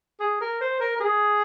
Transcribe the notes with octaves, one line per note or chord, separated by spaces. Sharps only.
G#4
A#4
C5
A#4
A#4
G#4